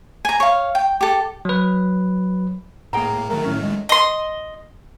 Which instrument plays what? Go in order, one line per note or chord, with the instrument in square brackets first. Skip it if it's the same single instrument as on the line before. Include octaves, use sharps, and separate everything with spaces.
[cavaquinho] G#5 A#5
C#5 F5
G5
G4 A4
[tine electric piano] F#3 B4
[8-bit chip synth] A2 A#3 [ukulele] G#4 G5 A#5
[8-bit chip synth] D#3 F#3 A3 [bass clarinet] A#4
[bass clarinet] A2 [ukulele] C#4
[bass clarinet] G#3
[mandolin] D#5 C6